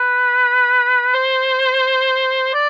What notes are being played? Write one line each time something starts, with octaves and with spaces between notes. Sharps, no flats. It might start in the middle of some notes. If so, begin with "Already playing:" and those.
Already playing: B4
C5
D5